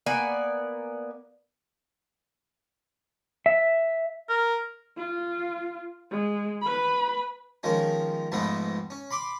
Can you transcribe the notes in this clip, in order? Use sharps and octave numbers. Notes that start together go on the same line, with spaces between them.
A#3 B3 D5 G#5
E5
A#4
F4
G#3
B4 B5
D#3 F3 G#3 C#4
F2 G#2 G#3 A3 B3 C4
C#4
B5 C6 D6